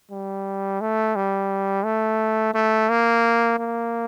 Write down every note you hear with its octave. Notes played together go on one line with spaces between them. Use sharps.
G3
A3
G3
A3
A3
A#3
A#3